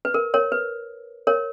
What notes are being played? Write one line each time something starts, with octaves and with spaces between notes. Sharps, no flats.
B4
A#4
A#4 C#5
B4
A#4 C#5